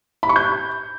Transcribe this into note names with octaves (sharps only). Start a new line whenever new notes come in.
B5
C#6
G6